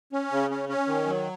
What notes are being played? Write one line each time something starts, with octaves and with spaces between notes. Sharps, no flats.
C#4
C#3
C#4
C#4
D#3
F#3